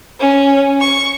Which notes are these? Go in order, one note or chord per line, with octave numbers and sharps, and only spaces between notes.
C#4
C#6